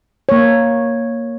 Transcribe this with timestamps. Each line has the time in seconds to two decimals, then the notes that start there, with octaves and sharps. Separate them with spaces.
0.29 A#3 C#5